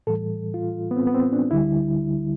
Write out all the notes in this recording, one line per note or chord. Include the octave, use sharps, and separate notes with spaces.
A2 E3 G3 A4
F4
B3
C4
B3
C4
D4
D2 D3 G3 E4